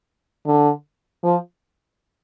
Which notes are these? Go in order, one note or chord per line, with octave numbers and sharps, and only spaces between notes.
D3
F3